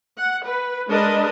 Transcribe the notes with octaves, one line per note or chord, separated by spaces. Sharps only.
F#5
B4
G#3 D4 A#4 B4 D#5